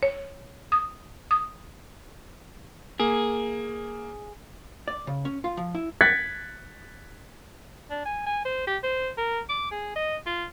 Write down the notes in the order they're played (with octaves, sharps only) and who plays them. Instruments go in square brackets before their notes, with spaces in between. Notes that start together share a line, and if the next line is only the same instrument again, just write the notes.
[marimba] C#5
D#6
D#6
[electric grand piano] A#3 [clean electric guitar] G#4
[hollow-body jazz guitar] D5
C#3
C#4
F4
F3
E4
[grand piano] F#6 G#6 A6 B6 C#7
[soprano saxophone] D4
G#5
G#5
C5
G4
C5
A#4
D6
G#4
D#5
F4